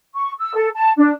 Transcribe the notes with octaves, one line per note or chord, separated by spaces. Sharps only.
C#6
E6
A4
A5
D4